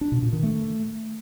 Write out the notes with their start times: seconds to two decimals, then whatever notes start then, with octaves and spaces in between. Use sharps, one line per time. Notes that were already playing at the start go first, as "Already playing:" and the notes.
0.01 D4
0.12 B2
0.22 A#2
0.33 D#3
0.43 A3